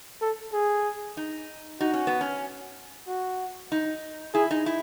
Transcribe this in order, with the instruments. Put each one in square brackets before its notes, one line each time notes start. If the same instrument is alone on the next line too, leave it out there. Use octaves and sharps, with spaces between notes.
[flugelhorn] A4
G#4
[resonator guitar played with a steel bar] D#4
[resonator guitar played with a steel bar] D#4 [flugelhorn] F#4
[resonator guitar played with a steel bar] C#4
B3
C#4
[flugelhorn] F#4
[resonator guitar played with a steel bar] D#4
[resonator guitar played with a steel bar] E4 [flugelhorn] G#4
[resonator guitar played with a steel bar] D#4
E4